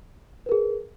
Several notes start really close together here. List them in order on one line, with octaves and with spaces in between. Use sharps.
B4 A#4 G#4